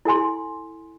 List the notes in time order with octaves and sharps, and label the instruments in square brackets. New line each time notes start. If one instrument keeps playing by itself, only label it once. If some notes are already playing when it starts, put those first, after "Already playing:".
[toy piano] E4 A4 G#5 C6